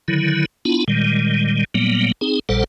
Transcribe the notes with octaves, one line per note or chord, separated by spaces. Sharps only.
D3 D#3 F#3 E4
B3 D4 E4 F4
A#2 D#3 G3 G#3
A#2 F#3 G3 A#3 B3
C4 D#4 G#4
A#1 A#2 G3 A4 C5 F#5